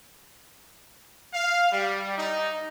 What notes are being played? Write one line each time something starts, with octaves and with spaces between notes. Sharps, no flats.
F5
G3
D#4